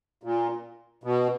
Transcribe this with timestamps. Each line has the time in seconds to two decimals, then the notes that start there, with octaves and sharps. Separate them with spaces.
0.24 A#2
1.04 B2